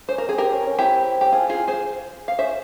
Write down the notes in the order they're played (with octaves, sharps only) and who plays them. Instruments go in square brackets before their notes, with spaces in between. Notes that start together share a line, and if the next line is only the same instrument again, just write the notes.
[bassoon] C#4 [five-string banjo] C5
[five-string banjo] A#4
[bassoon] C4 [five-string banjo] G#4
[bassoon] C4 [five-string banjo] G4 A#4
[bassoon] C#4
C#4
[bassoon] C4 [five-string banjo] E4 G4
[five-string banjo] G4
F4 G#4
F4 G#4
G#4 C5
F5
[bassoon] C#4 [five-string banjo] C5 E5